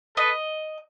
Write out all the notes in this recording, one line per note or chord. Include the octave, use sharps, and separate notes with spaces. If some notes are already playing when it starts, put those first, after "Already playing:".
A4 B4 D#5